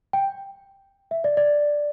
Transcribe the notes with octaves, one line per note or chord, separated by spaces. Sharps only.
G5
E5
D5
D5